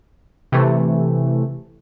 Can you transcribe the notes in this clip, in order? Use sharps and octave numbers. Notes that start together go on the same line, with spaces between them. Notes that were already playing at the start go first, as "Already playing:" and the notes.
C3 E3 A3